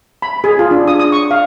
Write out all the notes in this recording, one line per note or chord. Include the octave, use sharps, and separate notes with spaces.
B5
G#4
F4
D4
D#6
D#6
C#6
F5